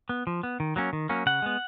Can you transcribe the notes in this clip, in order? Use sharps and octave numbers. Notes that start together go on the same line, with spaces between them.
B3
F3
B3
D#3
F#3 A#3 C#4
D#3
F#3 A#3 C#4
C#3 F#5
G#3 B3